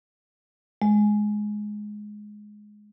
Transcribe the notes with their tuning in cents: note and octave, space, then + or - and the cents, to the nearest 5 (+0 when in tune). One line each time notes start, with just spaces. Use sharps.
G#3 +10